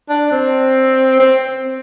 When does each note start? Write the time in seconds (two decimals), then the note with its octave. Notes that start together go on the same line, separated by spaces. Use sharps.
0.09 D4
0.31 C4
1.20 C4